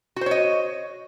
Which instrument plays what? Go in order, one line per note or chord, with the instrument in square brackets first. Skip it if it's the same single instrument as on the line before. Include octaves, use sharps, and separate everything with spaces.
[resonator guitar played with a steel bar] F#4
C5
C#5
D#5